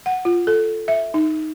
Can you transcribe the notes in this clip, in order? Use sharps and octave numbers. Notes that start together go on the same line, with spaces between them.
F#5
F4
A4
E5
D#4